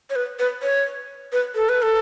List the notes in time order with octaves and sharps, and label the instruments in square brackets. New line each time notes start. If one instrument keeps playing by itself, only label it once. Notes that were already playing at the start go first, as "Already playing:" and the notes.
[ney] C#5
B4
B4
C#5
B4
A4
B4
A4